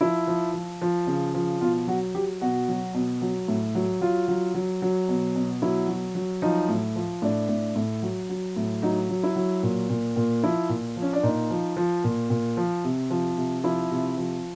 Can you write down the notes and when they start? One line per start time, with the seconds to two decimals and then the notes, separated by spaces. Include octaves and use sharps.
0.01 F3 E4
0.27 F3
0.54 F3
0.81 F3
1.07 C#3
1.34 F3
1.61 B2 F4
1.87 F#3 F#4
2.15 F#3 G4
2.41 B2 F#4
2.68 F#3
2.94 B2
3.22 F#3
3.48 A2
3.75 F#3
4.01 F#3 F4
4.28 F#3
4.55 F#3
4.82 F#3
5.09 B2
5.36 B2
5.62 F#3 E4
5.88 F#3
6.15 F#3
6.42 F3 D#4
6.69 A2
6.95 F3
7.22 A2 D4
7.49 A2
7.76 A2
8.02 F#3
8.30 F#3
8.56 A2
8.82 F#3 D#4
9.10 F#3
9.23 E4
9.36 F#3
9.63 A#2
9.90 A#2
10.16 A#2
10.43 F3 E4
10.69 A#2
10.97 F3
11.02 C#4
11.13 D4
11.23 A#2 D#4
11.50 F3
11.76 F3
12.04 A#2
12.30 A#2
12.57 F3
12.84 C3
13.10 F3
13.37 C3
13.64 F3 E4
13.91 C3
14.17 F3